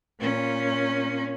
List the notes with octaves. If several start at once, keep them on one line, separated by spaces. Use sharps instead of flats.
A#2 C#4